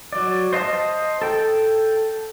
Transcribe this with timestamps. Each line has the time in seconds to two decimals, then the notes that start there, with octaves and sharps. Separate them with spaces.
0.13 F#3 D5
0.53 C5 D#5 F5 A5
1.22 A4 G5